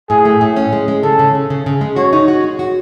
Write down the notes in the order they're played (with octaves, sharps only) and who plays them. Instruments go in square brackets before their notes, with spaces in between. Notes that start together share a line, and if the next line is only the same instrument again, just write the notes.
[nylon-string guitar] A2 [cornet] G#4
[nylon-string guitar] A3
A2
C#4
G#3
G#3
[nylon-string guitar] C#3 [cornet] A4
[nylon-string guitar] C#3
C#3
C#3
C#3
G#3
[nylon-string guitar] F#4 [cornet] C#5
[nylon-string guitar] D#4
F#4
G#3
F#4